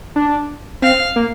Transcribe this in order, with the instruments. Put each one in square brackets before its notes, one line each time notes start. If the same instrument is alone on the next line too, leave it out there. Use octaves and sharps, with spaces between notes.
[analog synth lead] D4
[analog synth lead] C4 [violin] F5
[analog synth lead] A#3